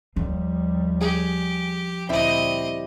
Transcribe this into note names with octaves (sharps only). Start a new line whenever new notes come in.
D#2 F3 G3
G4 G#4
D2 A#2 G3 C4 E4 D#5